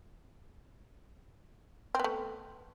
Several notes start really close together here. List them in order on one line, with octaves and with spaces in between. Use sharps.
C4 B3 A3